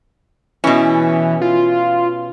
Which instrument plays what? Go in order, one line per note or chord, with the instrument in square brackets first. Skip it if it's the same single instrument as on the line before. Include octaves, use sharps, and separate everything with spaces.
[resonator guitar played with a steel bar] B2 C#4 [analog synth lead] E3
[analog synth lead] F4